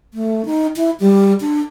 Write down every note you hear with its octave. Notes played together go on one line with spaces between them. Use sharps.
A3
D#4
E4
G3
D4